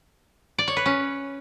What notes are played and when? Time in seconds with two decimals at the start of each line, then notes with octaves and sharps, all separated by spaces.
0.59 D5
0.68 C#5
0.77 B4
0.86 C#4